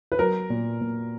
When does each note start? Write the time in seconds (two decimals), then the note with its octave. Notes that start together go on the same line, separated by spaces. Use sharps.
0.12 B4
0.19 F#3 A#4
0.50 A#2
0.81 A#2